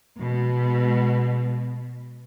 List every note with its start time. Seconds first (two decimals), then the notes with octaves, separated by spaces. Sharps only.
0.18 B2 G#3